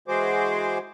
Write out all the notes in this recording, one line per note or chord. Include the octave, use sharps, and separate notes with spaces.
E3 G#3 F#4 G#4 C5 D6